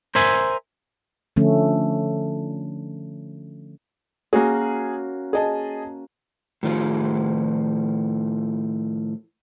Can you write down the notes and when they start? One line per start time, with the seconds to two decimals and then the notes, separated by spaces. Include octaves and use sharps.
0.15 A#4 C5 E5 G#5
1.36 D3 F3 A3 C#4
4.33 A#3 C#4 F#4 G#4
5.33 G#4 D#5 A5
6.63 A2 D#3 F3 F4